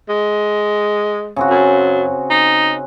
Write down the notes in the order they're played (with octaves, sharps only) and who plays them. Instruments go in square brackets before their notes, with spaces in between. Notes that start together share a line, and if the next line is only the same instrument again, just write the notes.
[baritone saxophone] G#3
[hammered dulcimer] C#3 C4 F#4
[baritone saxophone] F#2
D#4